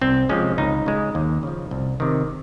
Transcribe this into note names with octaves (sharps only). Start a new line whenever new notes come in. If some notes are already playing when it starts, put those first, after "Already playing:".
C2 C4
C3 F3 G#3 C#4
C#2 D#4
C#3 G#3
D#2
C#3 F3
C2
C3 D#3